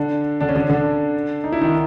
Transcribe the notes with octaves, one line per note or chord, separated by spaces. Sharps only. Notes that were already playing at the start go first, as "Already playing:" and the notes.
Already playing: D3 D4
D3 D4
C#4
D3 D4
D3 D4
D#4
E4
D#3 D#4